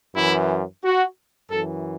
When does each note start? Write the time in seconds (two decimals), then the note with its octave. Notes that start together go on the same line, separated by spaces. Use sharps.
0.16 F#2 E3 E4
0.84 F#4
1.51 F#2 E3 A4